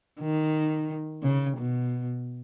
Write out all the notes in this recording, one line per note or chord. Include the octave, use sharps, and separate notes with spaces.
D#3
C#3
B2